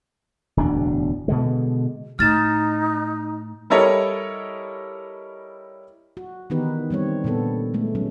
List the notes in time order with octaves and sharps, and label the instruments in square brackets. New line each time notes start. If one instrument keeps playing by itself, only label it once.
[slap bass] D1 E2 B2 D4
B2 D3 G#3
[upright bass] A2 [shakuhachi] D#4 [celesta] F6 A6 E7
[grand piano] G3 E4 A4 A#4 C#5 D#5
[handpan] F#4
D#3 E3 B3 D#4 G4 B4
D#3 G3 C4 C#5
A#2 D3 B3 A4
G#3 A3
F#3 G#3 C#4